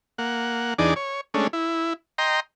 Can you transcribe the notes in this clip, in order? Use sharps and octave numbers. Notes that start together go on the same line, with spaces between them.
A#3 F#5
E2 D4 D#4 G#4 D5
C#5
G#3 A3 C#4 D4
E4
D#5 G5 A#5 C6